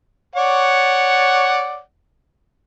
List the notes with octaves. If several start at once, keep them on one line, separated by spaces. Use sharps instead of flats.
C#5 D5 F#5